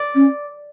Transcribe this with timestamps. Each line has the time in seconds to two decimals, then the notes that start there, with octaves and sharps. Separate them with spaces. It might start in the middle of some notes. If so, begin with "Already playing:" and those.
Already playing: D5
0.15 C#4